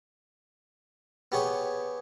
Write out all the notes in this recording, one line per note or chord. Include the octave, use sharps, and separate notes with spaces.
B3 G4 G#4 C#5